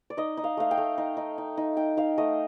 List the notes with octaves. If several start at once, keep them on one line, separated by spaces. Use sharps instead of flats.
D5
D#4 D#5
D#4
F5
A3 F5
G5
A3
D#4
D#4
D#4
D#4
D#4 G5
D#4 F5
A3 D#5